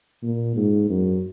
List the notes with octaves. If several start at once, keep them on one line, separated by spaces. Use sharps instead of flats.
A#2
G#2
F#2